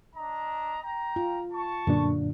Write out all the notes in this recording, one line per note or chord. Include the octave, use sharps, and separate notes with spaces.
D4 D#5 A#5
G5 A#5
F4
A5 C#6
F#2 A#2 D3 D4